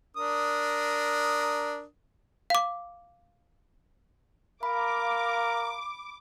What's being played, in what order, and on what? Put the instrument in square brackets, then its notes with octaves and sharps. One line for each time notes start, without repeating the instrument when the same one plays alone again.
[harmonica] D4 A#4 D#6
[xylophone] F5 D6
[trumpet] A#4 [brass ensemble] F5 A#5 [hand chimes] B5 [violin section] D6